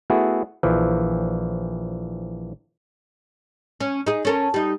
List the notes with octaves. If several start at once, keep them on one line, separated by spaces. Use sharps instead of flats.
A3 B3 E4 F#4 G#4
A#1 E3 F3
C#4
D#4 G#4
C#4 A4 A#4
G3 D#4